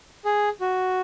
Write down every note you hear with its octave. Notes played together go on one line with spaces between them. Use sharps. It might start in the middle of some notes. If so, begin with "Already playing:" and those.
G#4
F#4